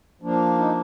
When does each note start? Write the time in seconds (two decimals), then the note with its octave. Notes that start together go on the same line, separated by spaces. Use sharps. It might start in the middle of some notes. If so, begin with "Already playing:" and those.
0.22 F3 A#3 D4
0.58 D#4